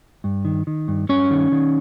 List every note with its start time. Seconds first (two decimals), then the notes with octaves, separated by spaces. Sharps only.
0.24 G2
0.45 D#3
0.67 D#3
0.88 G2
1.09 G2 C#4 C#5
1.31 D#3
1.52 D#3